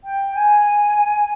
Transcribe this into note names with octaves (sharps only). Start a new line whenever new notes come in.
G5
G#5